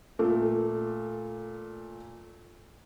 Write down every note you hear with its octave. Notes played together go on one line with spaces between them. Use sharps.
A#2 A3